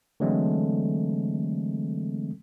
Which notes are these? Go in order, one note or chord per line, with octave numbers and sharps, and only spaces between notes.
D3 E3 F#3 G#3 A3 C4